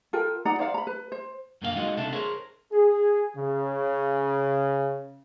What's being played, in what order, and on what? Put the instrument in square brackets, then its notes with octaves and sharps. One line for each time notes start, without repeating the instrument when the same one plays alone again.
[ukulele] F4 A4 A#4 G5
D#4 D5 F#5 A#5
C5 D5 F5 F#5
A#5 B5
B4
C5
[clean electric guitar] F#2 A#2 D3 A#3 F4 F5
G#3 A3 D#4 F4 F#4 D#5
C#2 C3 A3 D4 A4 E5
G#4 A#4 C5 C#5
[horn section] G#4
C#3